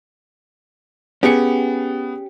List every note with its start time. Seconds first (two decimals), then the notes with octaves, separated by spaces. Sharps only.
1.23 B3 C#4 G4 G#4 C#7